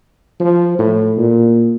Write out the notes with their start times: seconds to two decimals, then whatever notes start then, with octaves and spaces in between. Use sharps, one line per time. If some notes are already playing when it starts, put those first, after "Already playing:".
0.40 F3
0.79 A2
1.18 A#2